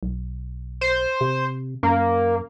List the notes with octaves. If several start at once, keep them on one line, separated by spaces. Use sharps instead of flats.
B1
C5
C3
F#2 A#3